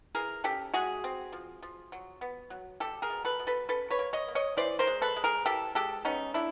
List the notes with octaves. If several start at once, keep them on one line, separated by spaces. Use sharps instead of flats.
E3 G#4 A#4
C#4 G4 A4
G#3 F#4 G#4
C4
F3
F3
F#3
B3
F#3
G3 G4 A4
G#4 A#4
B2
A4 B4
B2
A4 B4
C#4 A4 B4
B4 C#5
A#3
C#5 D#5
A#3
C#5 D#5
E3 C5 D5
A#4 C5
G#3
A4 B4
G#3
G#4 A#4
E3 G4 A4
G#3 G4 A4
B3 C#4 D#4
A3 D4 E4